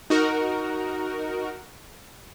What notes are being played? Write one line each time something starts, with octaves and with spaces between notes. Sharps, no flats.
D#4 F#4 A#4